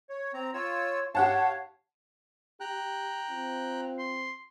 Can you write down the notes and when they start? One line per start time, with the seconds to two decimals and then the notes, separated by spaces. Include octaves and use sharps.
0.10 C#5
0.34 C4 A#5
0.54 F4 C#5 E6
1.15 G4 C#5 F5 F#5 A5
2.60 G4 G5 A#5 F#6
3.30 C4 F4
3.99 C6